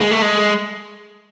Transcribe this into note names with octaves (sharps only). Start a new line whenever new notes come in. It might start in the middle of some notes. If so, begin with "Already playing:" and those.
G#3
A3
G#3